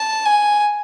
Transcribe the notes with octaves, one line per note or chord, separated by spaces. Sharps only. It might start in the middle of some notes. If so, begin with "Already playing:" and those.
Already playing: A5
G#5